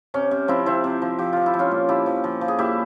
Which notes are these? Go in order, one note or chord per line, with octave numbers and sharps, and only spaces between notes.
C3 C#4
C3
F3 C4 E4
F3 C4 E4
C3
F3
F3 G4
F3 F4
E4
F3
C#4 F4
A#2
F3 E4 G4
F3
F3
F3
G#4
A#2 E4 G4